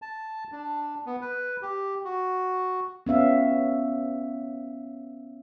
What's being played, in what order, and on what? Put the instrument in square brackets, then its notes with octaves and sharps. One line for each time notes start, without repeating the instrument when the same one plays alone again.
[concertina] A5
D4
B3
B4
G4
F#4
[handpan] B3 C#4 E5 F5